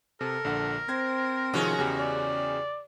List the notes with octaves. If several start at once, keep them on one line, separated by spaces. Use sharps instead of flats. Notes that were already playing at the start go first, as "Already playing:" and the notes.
C3 A4 A#4
A#1 D3 F#5
C4 C5 G#6 A#6
C3 D#3 F3 G#3 C#4 F#4
E2 C#3 G4
D5